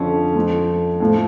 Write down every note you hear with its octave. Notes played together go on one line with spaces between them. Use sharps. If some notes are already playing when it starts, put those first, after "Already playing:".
Already playing: F2 D3 F3 C#4
F2 F3
A2 F3